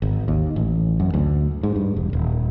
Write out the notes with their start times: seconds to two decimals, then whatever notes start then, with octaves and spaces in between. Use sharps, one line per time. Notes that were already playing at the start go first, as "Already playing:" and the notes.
0.02 G#1
0.28 D#2
0.56 A1
1.00 F#2
1.14 D2
1.63 G#2
1.76 G2
1.97 E1
2.13 D#1